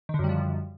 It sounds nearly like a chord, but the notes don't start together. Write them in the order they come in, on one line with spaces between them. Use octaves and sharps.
D#3 D3 F#2 G3 F3